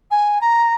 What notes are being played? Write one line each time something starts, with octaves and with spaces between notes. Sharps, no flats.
G#5
A#5